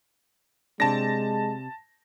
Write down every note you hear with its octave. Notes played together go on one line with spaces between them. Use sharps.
C3 G#3 D4 A5 A#6